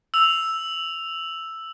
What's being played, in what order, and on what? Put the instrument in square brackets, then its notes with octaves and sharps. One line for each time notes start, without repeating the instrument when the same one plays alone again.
[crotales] E6 F7